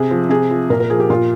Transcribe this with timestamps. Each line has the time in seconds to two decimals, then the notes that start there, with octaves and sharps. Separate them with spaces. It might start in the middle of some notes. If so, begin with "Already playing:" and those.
Already playing: C3 G#4
0.11 F3
0.30 C3 G#4
0.51 F3
0.70 A#2 A#4
0.80 A#4
0.90 F3 G#4
1.00 G4
1.10 A#2 F4